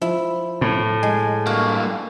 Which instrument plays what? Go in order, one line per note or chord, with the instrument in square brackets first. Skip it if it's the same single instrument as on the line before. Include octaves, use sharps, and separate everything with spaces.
[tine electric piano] F3 [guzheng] E4
[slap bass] A2
[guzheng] G#3 [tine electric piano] G#5
[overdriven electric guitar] G2 A#3 [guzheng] F#4